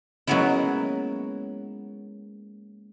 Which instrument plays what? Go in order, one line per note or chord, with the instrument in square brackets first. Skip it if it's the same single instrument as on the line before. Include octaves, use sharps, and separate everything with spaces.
[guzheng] F#3 G#3 A#3 B3 C#4 E4